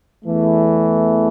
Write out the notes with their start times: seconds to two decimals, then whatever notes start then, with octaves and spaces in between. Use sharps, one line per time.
0.24 E2 E3 A3